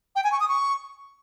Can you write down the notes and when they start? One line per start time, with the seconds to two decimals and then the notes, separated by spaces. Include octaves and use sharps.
0.16 G5
0.24 G#5
0.32 C#6
0.40 D#6
0.49 C#6